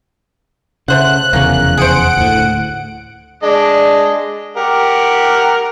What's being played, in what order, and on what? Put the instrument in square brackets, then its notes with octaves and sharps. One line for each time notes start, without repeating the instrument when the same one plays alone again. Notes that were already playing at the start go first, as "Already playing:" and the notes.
[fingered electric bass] C#3 [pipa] A3 C5 F#5 [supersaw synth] F#6
[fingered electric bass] F1 E2 C#3 [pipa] A#3 C#4
[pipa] G#4 C5 [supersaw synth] F#5 D7
[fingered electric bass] D2 A2
[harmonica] G#3 D4 D#5
G4 A#4 F#5